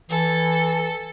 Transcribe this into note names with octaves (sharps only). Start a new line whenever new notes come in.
E3 A4